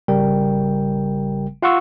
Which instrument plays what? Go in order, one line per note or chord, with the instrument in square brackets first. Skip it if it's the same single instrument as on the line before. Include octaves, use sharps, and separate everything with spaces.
[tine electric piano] G#1 C#3 G3 A#4 G5
F4 F5 F#5 C6 C#6 E6